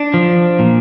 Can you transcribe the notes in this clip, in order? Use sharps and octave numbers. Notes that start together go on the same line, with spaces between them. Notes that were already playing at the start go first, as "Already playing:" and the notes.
Already playing: D4
F3
A#2